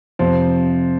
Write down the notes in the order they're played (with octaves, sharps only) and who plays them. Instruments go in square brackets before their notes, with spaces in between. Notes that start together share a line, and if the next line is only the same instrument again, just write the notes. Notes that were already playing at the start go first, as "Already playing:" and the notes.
[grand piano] F2 C3 F3 C4